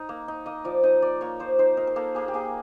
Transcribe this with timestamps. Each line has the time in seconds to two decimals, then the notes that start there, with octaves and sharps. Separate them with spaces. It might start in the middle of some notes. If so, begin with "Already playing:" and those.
Already playing: D#4
0.09 A#3
0.28 D#4
0.46 A#3 D#5
0.65 F3 D5
0.83 D#4 D#5
1.02 A#3 D5
1.21 A#3 C#5
1.40 F3 C5
1.59 D#4 C5
1.77 D#4 A#4
1.87 A#4
1.96 A#3 A4
2.15 A#3 G#4
2.28 G4
2.34 A#3 G#4